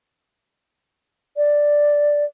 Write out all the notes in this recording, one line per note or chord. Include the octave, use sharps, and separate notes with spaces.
D5